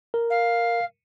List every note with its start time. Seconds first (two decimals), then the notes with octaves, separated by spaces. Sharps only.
0.14 A#4
0.30 F5